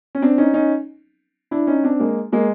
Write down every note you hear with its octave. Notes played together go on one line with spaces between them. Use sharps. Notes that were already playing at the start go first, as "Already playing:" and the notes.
C#4
C4 D4
C#4 D#4
C#4 D#4
D4 E4
C#4 D#4
C4 D4
G#3 A#3
G#3 A#3